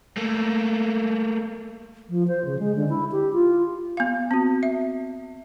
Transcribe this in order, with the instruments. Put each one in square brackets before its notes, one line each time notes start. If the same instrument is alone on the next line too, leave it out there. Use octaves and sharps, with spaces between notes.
[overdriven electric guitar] A3 A#3
[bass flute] F3
C5
C#3
G#3
D3
E4
G4
F4
[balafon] B3 F5
C4 F#4
E5